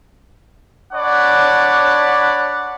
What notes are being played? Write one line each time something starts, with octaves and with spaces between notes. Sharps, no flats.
D4 C#5 D5 F#5 B5